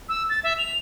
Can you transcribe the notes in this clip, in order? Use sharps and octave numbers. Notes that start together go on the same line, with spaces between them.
E6
A6
E5
F7